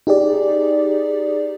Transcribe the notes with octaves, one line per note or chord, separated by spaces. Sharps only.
D#4 G4 G#4 D5